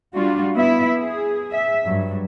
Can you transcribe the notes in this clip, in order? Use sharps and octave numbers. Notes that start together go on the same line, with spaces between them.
G3 D4 F4 F#4
B3 E4 E5
G#4
E5
G2 F#3